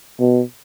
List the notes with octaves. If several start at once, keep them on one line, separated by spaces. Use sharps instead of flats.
B2